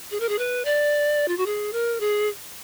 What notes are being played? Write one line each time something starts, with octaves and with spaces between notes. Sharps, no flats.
G#4
A#4
G#4
B4
D5
F4
F#4
G#4
A#4
G#4